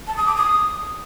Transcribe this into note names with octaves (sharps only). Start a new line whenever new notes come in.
A5
D#6
D6
D#6